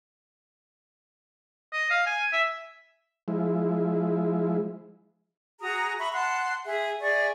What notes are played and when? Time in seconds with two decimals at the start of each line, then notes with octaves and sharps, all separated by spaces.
1.73 D#5
1.90 F5
2.07 G#5
2.33 E5
3.28 F3 G#3 E4
5.60 F#4 G#4 A#5 D#6
5.98 E5 A#5 B5 C#6
6.13 F#5 A5 C6 F#6
6.66 G#4 E5
6.99 G#4 D5 E5 C#6